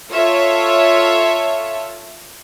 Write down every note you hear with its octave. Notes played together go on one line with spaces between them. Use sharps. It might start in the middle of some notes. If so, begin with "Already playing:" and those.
F4 A4 C#5 E5